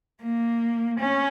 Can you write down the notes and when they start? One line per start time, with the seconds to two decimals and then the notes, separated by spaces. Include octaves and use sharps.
0.24 A#3
1.00 C#4